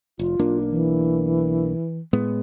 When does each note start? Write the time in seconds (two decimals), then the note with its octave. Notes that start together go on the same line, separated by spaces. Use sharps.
0.19 F1 F4
0.39 B1 A#3 D4
0.70 E3
2.13 A2 G#3 B3